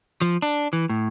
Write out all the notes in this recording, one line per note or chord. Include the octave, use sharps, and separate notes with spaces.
F3
D4
E3
A2